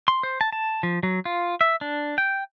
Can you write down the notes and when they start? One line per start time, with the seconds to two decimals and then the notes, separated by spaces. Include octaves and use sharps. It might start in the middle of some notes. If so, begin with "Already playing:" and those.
0.08 C6
0.23 C5
0.41 A5
0.52 A5
0.83 F3
1.03 F#3
1.25 F4
1.61 E5
1.81 D4
2.18 G5